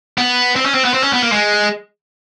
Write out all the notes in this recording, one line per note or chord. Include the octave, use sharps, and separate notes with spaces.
B3
C4
C#4
C4
B3
C4
C#4
B3
A#3
G#3